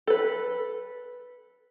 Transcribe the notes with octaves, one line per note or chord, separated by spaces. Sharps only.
A4 B4